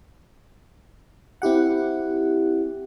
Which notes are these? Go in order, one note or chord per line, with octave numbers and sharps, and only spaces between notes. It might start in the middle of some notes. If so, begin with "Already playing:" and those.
C4 E4 G4 F#5